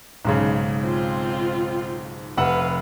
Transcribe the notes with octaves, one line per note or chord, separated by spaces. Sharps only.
B1 G#2 C#3
C4 F4
F1 B4 F5 F#5 E6